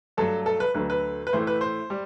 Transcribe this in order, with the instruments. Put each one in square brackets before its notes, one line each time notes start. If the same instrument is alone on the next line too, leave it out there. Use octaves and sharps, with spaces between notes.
[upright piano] G2 F#3 A3 A4
A4
B4
D2 D3 F#3 A3 B4
B4
B4
A2 E3 A3 C5
B4
C5
G3